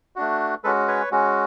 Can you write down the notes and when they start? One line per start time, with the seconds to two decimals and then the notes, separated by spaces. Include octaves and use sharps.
0.16 A3 D4 F#4
0.64 G#3 C#4 F#4 A4 B4
0.87 B4 C#5
1.11 G#3 C#4 F#4